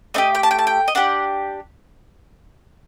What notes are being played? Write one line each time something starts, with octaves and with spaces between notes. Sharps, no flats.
A3 D4 G4 D#5
G5
A5
G5
A5
G5
D#5
D4 G4 F#5